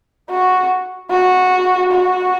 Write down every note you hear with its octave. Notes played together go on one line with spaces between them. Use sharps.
F#4
F#4
F#4